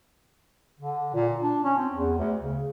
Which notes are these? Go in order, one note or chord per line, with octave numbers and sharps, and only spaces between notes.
D3
A#2
D4
C#4
C4
E2
D2
C#3